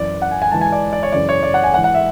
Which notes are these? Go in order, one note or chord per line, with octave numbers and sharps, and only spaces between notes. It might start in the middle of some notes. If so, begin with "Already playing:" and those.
Already playing: F#2 E3 D5
F#5
G#5
G#5
G#2 E3 A5
G#5
D5
D5
C#5
F#2 C#3 E3 D5
C#5
D5
F#5
G#5
G#2 E3 F#5
F#5
E5